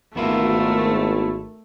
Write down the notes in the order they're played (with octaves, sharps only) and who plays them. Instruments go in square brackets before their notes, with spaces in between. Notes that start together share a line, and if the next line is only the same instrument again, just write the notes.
[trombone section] G#1 [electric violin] A3 [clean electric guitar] B3 E4 F4 [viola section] A#4